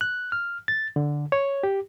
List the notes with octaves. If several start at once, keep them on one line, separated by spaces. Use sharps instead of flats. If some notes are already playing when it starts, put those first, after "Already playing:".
F#6
F6
A6
D3
C#5
G4